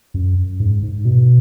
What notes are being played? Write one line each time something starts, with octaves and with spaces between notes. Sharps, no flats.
F#2
G#2
G#2
B2